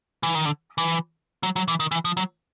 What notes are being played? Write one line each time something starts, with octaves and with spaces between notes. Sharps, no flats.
E3
D#3
D3
E3
F#3
F#3
E3
D#3
E3
F3
F#3